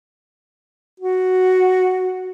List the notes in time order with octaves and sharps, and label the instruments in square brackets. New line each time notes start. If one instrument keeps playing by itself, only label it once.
[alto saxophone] F#4